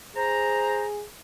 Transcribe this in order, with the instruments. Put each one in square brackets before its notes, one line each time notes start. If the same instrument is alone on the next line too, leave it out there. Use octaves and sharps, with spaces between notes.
[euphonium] G#4 [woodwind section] C5 A#5